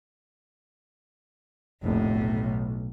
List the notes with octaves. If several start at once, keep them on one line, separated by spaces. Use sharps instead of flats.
F1 A#1 A2
B1